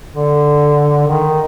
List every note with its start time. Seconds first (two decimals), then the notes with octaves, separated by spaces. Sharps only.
0.13 D3
1.07 D#3